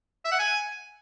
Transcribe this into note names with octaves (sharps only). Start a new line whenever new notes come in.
E5
F#5
G#5